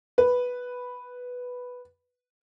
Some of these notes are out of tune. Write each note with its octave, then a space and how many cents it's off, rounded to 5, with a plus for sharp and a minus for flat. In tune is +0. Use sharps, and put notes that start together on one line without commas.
B4 +0